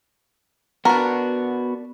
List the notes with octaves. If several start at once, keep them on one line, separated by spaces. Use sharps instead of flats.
B3 D4 F#4 A#4